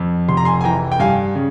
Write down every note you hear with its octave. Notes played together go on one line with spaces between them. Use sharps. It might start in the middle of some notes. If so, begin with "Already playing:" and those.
Already playing: F2
F1 C6
A#5
G#5 C6
G#5
E3 G5 A#5
G5
G2 F5 G#5
C#3